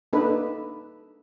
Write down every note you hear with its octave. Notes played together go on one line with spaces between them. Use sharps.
A#3 D4 D#4 A4 B4